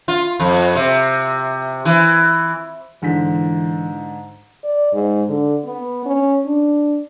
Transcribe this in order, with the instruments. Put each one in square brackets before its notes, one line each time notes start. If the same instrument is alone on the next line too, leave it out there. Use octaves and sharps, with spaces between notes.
[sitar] F4
F2
C3
E3
[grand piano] G#2 D3 B6 [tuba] E3
[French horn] D5
G#2
D3
B3
C#4
D4